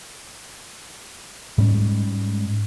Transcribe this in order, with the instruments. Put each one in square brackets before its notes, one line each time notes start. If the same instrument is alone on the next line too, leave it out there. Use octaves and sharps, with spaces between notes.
[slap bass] G#2 G3 G#3 C#4